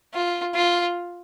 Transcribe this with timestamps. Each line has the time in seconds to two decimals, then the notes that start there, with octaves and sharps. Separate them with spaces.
0.14 F4
0.55 F4